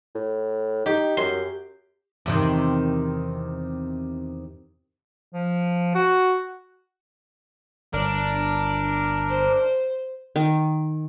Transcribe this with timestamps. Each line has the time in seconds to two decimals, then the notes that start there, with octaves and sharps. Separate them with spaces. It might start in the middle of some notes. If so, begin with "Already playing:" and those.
0.15 A2
0.86 D#4 G4
1.17 F#2 C6
2.26 E2 C3 D#3
5.34 F3
5.95 F#4
7.93 G1 D4 A#4
9.29 C5
10.36 D#3